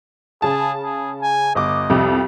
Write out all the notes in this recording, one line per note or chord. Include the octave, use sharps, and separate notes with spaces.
C#3 G#4 A5
G#4
G#5
G1 D#5 D6
C2 F2